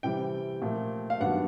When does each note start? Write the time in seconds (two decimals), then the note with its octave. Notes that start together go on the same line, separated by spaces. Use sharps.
0.03 C3 E3 G3 C4 G5
0.62 A#2 F3 A3
1.10 F5
1.20 G2 D#3 F#3 B3 D4 F#5